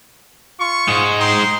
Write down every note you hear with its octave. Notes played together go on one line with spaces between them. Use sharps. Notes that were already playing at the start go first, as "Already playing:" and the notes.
F4 C#6
G#2 G#3
D#4 G5 C6